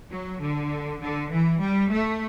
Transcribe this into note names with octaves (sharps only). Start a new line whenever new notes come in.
F#3
D3
D3
E3
G3
A3